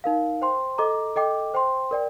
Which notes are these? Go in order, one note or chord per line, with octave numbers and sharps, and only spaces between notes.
D#4 A#4 F5
C5 G5 C6
A4 D#5 A#5 D6
A4 D#5 G5 D6
C5 G5 C6
A#4 D5 G5